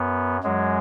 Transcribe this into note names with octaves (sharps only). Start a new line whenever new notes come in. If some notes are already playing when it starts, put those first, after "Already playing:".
Already playing: F#2 B3
F#2 F#3 G#3